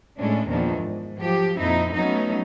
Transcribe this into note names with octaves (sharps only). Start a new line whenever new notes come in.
A2 G#3 A3 C#4 D4
E2 A#2 D#3 F3 D4
G#2
F3 F#3 G4
F2 A#2 C4 D#4 E4
F#3 A3 B3 C#4 D#4